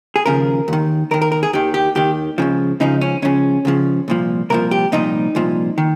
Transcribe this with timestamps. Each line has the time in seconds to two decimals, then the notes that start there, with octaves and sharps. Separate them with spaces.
0.16 G#4
0.26 D#2 C#3 F3 A#4
0.68 D#2 D#3
1.11 D#2 D#3 A#4
1.22 A#4
1.32 A#4
1.43 G#4
1.53 D#2 D#3 G4
1.74 G4
1.95 D#2 D#3 G4
2.38 C#2 C#3 F3
2.80 C#2 C#3 F3 D#4
3.01 C#4
3.22 C#2 C#3 F3 C#4
3.65 C#2 C#3 F3
4.08 C2 A#2 F3
4.50 C2 A#2 F3 A#4
4.71 G4
4.92 C2 A#2 F3 D#4
5.35 C2 A#2 F3
5.78 D#3